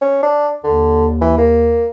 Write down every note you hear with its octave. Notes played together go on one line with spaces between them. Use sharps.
C#4
D4
D#2 D3
E3
A#3